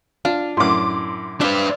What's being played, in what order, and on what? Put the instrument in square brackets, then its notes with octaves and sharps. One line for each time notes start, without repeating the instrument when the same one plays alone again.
[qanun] D4 [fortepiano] F4
[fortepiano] F#2 A2 [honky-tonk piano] C6 D6
[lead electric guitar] D4 B4 [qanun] C5 E5 F5